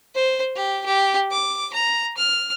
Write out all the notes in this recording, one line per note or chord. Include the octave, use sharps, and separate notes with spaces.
C5
G4
G4
D6
A#5
F6